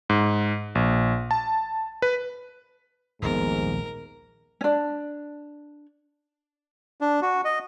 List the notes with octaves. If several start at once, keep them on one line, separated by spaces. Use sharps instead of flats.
G#2
A#1
A5
B4
D#1 A#1 G#2 B3 A#4
C#4 D4
D4
F#4
D#5